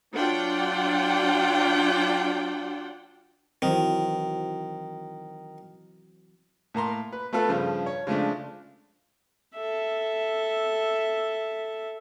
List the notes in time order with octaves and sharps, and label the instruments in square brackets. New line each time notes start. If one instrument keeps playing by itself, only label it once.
[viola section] F#3 D4 F4 F#5 G5
[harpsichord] D#3 [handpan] E3 F#3 C4
[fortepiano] A2 A#3 A#5 C6
B4
A3 B3 F4 A4 B4
G2 C#3 F3
C#5
C#3 F3 G#3 A3 D4
[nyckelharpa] A4 E5